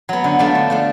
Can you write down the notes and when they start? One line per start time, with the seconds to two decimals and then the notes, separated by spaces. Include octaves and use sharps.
0.09 F#3 B3
0.24 D3
0.39 F3 A3 D4
0.55 D3
0.70 F3 A3 D4